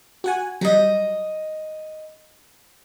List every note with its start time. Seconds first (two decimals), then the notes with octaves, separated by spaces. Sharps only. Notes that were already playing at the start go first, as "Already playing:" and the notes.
0.24 F#4 F#5 G#5
0.61 F#3 G3 D#5 A#5